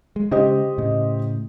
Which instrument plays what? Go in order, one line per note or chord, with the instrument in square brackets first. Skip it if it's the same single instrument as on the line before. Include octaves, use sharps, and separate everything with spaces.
[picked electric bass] G#3
[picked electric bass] C#3 G#3 [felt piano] G4 C5 D#5
[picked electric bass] A2 C#3